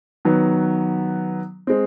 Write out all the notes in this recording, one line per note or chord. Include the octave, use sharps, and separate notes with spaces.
D#3 F#3 B3
G#3 C4